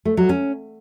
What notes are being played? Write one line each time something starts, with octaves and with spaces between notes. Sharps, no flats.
A3
F#3
C#4